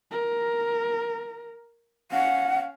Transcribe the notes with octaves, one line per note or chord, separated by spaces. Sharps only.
A#4
C#4 F5 F#5